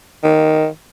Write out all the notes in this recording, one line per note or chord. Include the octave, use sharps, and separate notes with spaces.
D#3